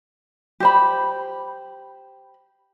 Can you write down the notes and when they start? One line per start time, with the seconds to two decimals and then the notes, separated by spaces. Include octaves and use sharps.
0.60 G4 C5 B5